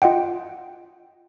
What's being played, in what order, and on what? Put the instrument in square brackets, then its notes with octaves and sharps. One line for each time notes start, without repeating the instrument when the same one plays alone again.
[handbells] F4 D#5 F#5 G5